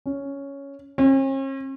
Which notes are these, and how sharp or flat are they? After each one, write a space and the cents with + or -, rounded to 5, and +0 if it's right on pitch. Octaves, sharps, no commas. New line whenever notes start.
C#4 +5
C#4 -45